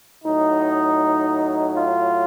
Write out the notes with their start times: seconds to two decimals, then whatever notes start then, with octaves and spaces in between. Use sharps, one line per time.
0.24 A2 F#3 D#4
1.77 F4